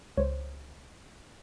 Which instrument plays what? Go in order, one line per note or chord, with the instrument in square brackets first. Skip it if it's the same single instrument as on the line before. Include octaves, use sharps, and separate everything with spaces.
[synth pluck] C#2 [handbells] C5 C#5